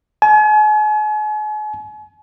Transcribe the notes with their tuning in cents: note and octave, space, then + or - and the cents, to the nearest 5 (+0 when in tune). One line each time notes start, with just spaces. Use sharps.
G#5 +40